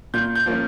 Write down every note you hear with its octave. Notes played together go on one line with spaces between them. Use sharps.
A#2 G6
G6
F3 A#3 C#4